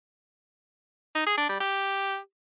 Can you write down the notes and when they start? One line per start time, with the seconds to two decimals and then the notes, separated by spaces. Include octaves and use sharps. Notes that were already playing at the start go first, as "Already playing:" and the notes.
1.15 D#4
1.26 G#4
1.38 D4
1.49 G3
1.60 G4